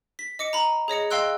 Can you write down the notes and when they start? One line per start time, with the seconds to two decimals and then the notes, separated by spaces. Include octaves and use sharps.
0.19 B6
0.39 D#5 D6 C#7
0.53 A#5 B5
0.88 G#4 C#5 D#5 C#7
1.11 D#5 F5 G5 C6 E6 F#6